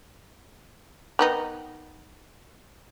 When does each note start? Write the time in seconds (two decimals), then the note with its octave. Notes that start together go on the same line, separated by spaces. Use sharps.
1.19 D#3 B3 D#4